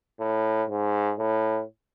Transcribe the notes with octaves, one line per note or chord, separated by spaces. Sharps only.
A2
G#2
A2